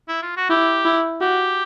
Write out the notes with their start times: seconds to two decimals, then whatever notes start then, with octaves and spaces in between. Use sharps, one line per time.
0.09 E4
0.22 F4
0.37 F#4
0.50 E4 G4
0.85 E4
1.21 F#4 G4